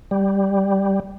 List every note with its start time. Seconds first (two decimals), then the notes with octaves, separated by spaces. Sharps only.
0.11 G3